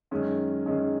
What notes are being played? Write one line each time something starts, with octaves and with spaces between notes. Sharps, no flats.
F#2 D#3 G#3 C#4 G#4
F#2 D#3 G#3 C#4 G#4